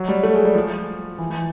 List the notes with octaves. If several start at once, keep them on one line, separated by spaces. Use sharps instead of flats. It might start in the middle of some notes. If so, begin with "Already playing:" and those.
Already playing: F#3
G3
A3
G#3
G3
F3
E3
E3